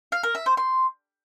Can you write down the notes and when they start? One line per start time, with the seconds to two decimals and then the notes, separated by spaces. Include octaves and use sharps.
0.12 F5
0.23 A#4
0.35 E5
0.46 C5
0.57 C6